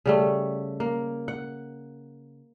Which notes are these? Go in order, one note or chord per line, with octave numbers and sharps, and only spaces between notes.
C#3 G3 A3
A#3
F#5